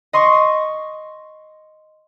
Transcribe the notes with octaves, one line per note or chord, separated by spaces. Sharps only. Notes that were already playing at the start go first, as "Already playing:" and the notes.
D#5 C6 C#6